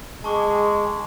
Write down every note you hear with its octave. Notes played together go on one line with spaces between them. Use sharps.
G#3 A5 C#6 D6